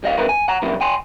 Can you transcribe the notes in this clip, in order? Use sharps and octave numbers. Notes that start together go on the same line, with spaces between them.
G3 D#5 F5
E2 G2 C#3 E4 A#4 B4
G#5
F#5 A#5
F#2 C3 E3 G3 A#3 E4
G5 G#5 C6